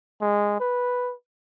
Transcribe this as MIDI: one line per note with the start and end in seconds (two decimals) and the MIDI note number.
0.21 0.58 56
0.60 1.14 71